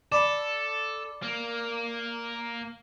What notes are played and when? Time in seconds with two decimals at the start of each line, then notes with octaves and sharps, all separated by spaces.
0.12 A4 D5 B5
1.23 A#3